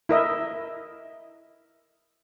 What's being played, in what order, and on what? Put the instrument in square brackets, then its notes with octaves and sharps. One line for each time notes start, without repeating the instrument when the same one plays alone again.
[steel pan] E4 A#4 D#5 E5